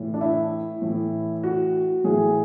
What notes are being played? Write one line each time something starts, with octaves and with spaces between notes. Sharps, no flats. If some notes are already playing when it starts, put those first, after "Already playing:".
Already playing: A2 E3
D4
E4
A2 E3
F#4
A2 E3 G#4